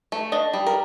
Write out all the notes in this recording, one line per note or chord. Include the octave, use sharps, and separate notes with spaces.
A3
D4 D#5
G3
A#4